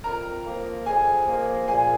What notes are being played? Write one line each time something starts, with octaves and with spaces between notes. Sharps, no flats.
F2 A#4 A#5
F3 A#3
F2 G#4 G#5
F3 A#3
A#2 G#4 G#5